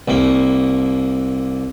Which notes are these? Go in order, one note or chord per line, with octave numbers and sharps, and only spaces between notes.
C2 A#3